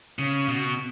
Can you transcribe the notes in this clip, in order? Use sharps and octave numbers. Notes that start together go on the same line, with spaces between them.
C#3
B2